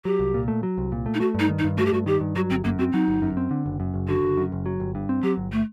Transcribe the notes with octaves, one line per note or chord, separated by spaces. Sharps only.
F#3 G4
C2
A#2
A3
F#3
C2
A#2
A3
D#4
A3 F#4
G2
D#4
D#3
D#4
G2
A3 F#4
G4
G2 F#4
D#3 G4
G2
F#3 F#4
G1 C4
F#2 A#3
C4 F#4
F#3 D#4
G1
F#2
C4
D3
F#1
F#2
F#1
D3 F#4
F#1
F#2
F#1
F#3
G1
G2
C4
F#3 G4
G1
A3